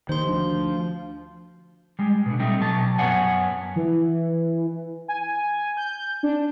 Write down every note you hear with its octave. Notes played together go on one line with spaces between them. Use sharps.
D#2 D#3 C5 C6
D2 F3
G3 G#3
B2 D3
G3 A3 C4 D#4
B2 F#3 A5
F#2 B3 C#5 F#5 G#5
E3
G#5
G6
D4